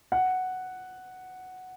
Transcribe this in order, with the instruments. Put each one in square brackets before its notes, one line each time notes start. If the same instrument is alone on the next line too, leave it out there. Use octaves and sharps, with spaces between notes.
[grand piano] F#5